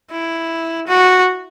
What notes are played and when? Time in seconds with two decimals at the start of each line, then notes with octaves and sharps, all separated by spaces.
0.12 E4
0.87 F#4